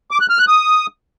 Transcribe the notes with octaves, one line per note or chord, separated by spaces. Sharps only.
D6
F#6
F6
F#6
D#6